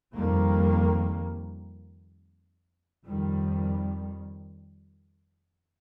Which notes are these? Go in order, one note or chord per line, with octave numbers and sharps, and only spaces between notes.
F2 D#3 G3 A#3
F2 D#3 G3